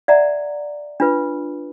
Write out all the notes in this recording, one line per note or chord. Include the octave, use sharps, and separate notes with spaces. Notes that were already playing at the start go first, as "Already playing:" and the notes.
D5 E5 F#5 A#5
D4 F4 B4